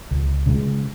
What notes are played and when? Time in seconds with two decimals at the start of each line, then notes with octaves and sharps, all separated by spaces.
0.11 C#2
0.46 C#3 G#3